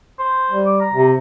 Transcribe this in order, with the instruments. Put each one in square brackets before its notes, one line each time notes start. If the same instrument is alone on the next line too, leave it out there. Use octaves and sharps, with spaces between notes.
[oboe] C5
[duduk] G3
[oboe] D6
A#5
[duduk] C3